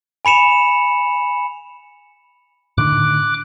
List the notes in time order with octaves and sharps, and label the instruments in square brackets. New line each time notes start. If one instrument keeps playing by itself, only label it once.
[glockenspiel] G#5 B5 C#7 E7 F7
[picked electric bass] A2 D3 D#3 [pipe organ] D6 F#6